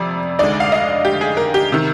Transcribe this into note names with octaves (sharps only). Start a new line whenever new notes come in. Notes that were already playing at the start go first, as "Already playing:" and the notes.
Already playing: F2 C3 D5
D2 D3 G#3 D#4 D5
F5
D#5
G4
G#4
A#4
G4
C3 D#3